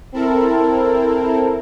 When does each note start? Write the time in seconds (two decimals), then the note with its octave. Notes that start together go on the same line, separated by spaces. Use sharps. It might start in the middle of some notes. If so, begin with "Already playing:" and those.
0.12 C4 E4 A4 A#4